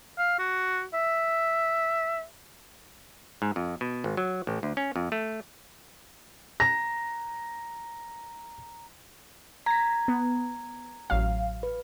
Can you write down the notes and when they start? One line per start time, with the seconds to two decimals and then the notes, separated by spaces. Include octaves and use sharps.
0.18 F5
0.39 F#4
0.94 E5
3.42 G#2
3.56 F2
3.81 B2
4.04 G#1
4.17 F#3
4.47 A1
4.63 D2
4.77 C#4
4.96 F2
5.12 A3
6.60 A#5 A#6
9.66 A#5 G#6 A#6 B6
10.08 B3
11.10 A1 F#3 F5
11.63 B4